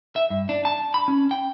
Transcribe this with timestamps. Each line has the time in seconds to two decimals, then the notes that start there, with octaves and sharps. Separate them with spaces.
0.16 E5
0.30 G2
0.49 D4
0.65 A5
0.94 B5
1.08 C#4
1.31 G5